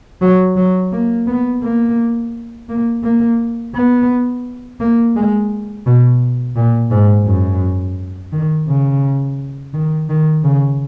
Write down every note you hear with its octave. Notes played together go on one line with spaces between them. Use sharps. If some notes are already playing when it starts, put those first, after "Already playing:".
F#3
F#3
A#3
B3
A#3
A#3
A#3
B3
A#3
G#3
B2
A#2
G#2
F#2
D#3
C#3
D#3
D#3
C#3